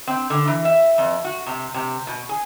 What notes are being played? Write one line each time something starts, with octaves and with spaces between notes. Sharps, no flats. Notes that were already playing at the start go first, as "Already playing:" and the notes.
C4
D3
E3
E5
F2
F#4
C3
C3
B2
G#4